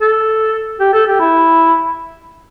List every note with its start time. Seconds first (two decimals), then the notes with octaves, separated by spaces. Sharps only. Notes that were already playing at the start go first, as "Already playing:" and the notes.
0.01 A4
0.80 G4
0.93 A4
1.07 G4
1.20 E4